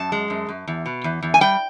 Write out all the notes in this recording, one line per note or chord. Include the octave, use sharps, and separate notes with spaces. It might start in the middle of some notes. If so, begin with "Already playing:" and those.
Already playing: F#2 A5
G#3
F#2
F#2
E2
B2
E2
E2
G#5
G3 G5